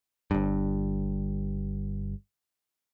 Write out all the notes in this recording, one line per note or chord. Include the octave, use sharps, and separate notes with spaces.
G1 G2